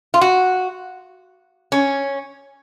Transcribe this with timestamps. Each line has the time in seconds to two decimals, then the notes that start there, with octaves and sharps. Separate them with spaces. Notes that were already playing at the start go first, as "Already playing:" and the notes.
0.14 F4
0.21 F#4
1.72 C#4